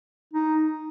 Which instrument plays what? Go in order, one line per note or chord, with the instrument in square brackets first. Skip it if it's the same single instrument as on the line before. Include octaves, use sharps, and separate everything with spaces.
[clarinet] D#4